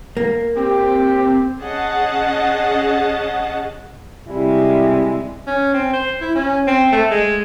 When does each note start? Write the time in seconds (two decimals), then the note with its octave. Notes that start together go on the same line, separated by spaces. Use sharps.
0.17 A#3
0.56 C4 G4
1.60 C#4 G#4 D#5 F#5 A5
4.28 C3 G3 G#3 E4
5.47 C#4
5.74 C4
5.93 C5
6.21 E4
6.35 C#4
6.67 C4
6.92 A3
7.11 G#3